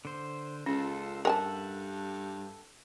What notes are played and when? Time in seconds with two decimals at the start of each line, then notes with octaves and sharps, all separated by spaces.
0.05 D3 C5
0.66 C#2 C#4 F4 A4
1.25 G2 A4 A#4 E5 F#5 G#5 A5